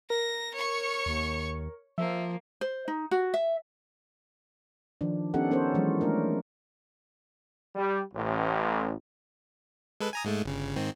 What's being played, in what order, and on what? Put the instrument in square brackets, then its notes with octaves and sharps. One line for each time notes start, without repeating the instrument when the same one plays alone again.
[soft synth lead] A#4 [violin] A#6
[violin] C#5 C#6
[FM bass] D#2
[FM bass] F3 [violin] A#3 [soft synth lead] E5
[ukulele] C5
D#4
F#4
E5
[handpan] D#3 F3 D4
B3 C#4 D#4 G4 A4 F#5
B3 C#4 A4 A#4 C5 C#5
E3 F#3 G#3
A3 D4 A#4
[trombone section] G3
A1
[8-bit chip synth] G#3 A4 B4
G#5 A#5 D#6
G#2 G#3 A3
G1 C#3
G#2 D#3 C4